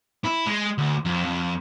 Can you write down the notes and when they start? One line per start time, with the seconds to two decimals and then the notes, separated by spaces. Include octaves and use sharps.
0.25 E4
0.46 G#3
0.78 D2
1.05 F2
1.25 F2